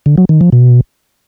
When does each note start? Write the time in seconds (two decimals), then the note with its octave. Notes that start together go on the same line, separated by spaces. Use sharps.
0.06 D3
0.18 F#3
0.29 D#3
0.41 F3
0.52 B2